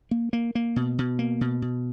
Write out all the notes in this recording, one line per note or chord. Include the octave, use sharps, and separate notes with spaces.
A#3
A#3
A#3
B2
B2
A#3
B2
B2